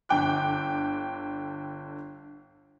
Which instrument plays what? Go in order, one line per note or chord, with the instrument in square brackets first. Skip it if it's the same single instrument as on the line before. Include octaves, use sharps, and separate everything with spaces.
[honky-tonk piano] G1 D3 G5 D6 F#6